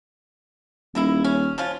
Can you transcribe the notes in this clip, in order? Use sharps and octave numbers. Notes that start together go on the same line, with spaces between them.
D#1 E3 A#3 E4
C#4
F3 C#4 F4